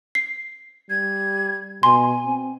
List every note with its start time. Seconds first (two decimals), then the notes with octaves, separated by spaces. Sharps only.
0.15 C7
0.90 G3 G#6
1.83 B2 G#5 C6
2.25 C4